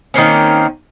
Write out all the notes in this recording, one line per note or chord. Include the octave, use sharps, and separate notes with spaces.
D#3 A#3 C4 C#4